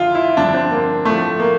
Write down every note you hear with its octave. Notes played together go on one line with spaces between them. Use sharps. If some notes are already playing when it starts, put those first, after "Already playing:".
Already playing: F2 D3 F3 E4 F4
E4
G2 D3 F3 D4
C4
A#3
A2 F3 A3
A#3